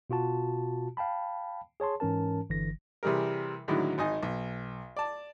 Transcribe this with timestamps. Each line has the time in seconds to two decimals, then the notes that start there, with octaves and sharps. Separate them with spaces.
0.10 B2 F4 F#4 A5
0.97 F5 G5 A5 B5
1.80 G#4 C#5 A5 C6
2.00 G#2 E3 C#4 A#4 A5
2.50 G1 D3 E3 A#6
3.03 C3 E3 G3 G#4 A#4
3.68 A2 D3 D#3 F#3 G#3 E4
3.98 G#1 D#4 D#5 G#5
4.23 B1
4.97 D5 A5